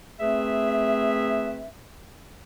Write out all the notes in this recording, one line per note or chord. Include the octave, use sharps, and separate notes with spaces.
A3 C4 G#4 B4 E5